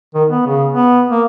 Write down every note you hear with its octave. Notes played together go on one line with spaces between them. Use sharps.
D#3
B3
C#3
B3
A#3